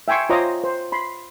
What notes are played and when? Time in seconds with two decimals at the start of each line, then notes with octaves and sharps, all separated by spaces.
0.08 E5 G5 G#5 C6 C#6
0.29 F4 C5 C#5 D#5 A#5 D6
0.64 C5
0.92 B5 C6